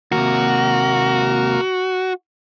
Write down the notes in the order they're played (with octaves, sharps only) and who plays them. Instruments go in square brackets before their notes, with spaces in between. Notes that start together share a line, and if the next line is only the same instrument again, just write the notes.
[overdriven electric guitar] D#2 C3 [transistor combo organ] A#3 A#4 [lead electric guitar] F#4